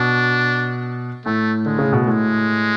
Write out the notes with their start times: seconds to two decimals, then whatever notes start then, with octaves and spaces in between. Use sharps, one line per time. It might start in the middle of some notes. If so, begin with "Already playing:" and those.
Already playing: B2 D4
1.26 A2 A3
1.66 D3 G#3
1.79 C#3
1.93 B2
2.07 A2 G#3